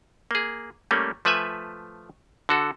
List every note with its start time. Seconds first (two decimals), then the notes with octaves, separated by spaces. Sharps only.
0.31 A#3 G#4
0.91 G3 A3 A#3 C#4
1.25 F3 A3 B4 E5 G#5
2.49 D3 F#4 A4